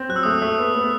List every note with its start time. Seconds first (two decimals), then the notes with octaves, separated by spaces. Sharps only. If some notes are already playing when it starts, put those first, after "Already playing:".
Already playing: C4
0.09 F#3 F#6
0.16 E6
0.23 A3 D#6
0.31 E6
0.42 A3
0.59 B3
0.75 B3